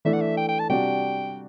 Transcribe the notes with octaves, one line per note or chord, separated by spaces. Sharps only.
E3 A3 D4 E5
F#5
E5
G5
G5
A5
C3 G3 D4 F#4 G5